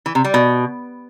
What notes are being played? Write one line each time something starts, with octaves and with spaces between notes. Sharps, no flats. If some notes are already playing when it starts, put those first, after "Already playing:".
E3
C3
G3
B2